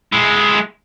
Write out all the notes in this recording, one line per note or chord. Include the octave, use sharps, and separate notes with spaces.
G#3 E4